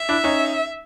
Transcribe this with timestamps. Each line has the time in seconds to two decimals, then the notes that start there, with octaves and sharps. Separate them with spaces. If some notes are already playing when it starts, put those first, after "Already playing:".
Already playing: E5
0.09 D4 E4
0.24 C#4 D#4